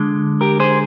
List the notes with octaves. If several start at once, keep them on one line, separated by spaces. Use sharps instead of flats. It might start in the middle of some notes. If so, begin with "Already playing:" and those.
Already playing: D3 G#3
G4 A#4
G#4 C5